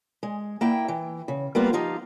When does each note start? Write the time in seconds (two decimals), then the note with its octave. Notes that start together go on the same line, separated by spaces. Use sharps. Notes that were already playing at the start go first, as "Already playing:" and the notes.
0.23 G#3
0.61 A#3 E4 G5
0.88 E3
1.28 C#3
1.55 G3 A#3 B3 F4
1.73 F3 D#4 F4 G4